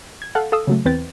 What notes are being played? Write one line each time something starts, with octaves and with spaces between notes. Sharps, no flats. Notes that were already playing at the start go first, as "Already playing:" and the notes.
G#6
A4 F5 F#5
A4 F5 D#6 E6
C#3 F#3 A3
E2 C4 B4 G5 A6